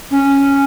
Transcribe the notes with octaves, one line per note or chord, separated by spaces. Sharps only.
C#4